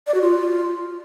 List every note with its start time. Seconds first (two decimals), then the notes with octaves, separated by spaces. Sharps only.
0.07 D5
0.14 F#4
0.22 F4